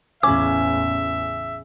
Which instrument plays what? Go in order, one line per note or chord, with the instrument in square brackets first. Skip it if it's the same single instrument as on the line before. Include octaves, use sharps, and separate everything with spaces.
[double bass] A1 E2 [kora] C#3 C#4 [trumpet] E5 [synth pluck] D6